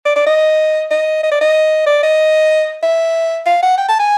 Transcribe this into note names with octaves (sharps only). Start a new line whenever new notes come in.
D5
D5
D#5
D#5
D#5
D5
D#5
D5
D#5
E5
F5
F#5
G5
A5
G#5